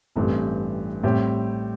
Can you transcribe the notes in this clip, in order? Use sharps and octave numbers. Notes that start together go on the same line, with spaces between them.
A1 G2 E3 A3 C4
A2 G3 C4 G4